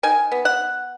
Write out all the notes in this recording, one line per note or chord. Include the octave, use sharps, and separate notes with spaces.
D#3 G#5
B3
F#5